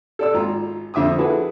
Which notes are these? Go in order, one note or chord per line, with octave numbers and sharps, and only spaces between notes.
A4 D5 E6
G#1 F4 A#5
F2 D3 E5 D6 D#6
E4 F#4 G#4 A4 B4